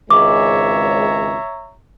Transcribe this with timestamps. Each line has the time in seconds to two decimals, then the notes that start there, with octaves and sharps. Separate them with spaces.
0.10 G#1 C#2 G#3 C#5 E5 A#5 D6